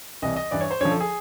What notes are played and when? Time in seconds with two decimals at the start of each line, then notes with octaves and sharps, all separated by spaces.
0.22 C2 C3 E3 D#5
0.36 D#5
0.51 G2 E3 D5
0.61 C#5
0.71 C5
0.81 F#2 D3 F3 C#5
0.91 A4
1.00 G#4